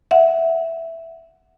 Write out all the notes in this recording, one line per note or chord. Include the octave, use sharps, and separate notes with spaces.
E5 F#5